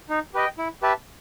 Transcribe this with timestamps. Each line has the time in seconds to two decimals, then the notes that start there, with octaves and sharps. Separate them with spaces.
0.09 D#4
0.34 G4 B4 D#5 G5
0.58 E4
0.82 G4 B4 E5 A5